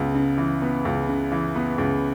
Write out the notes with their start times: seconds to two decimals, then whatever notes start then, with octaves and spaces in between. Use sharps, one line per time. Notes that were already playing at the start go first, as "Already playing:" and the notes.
Already playing: C#2 B3
0.14 C#3
0.38 E3
0.62 B3
0.85 C#2
1.09 C#3
1.32 E3
1.56 B3
1.78 C#2